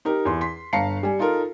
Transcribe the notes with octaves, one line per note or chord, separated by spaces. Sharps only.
D#4 G4 A#4
E2 C6
C6 B6
G1 F5 A5 A#5 C7 C#7
G3 G#5
D#4 F4 A4 A#4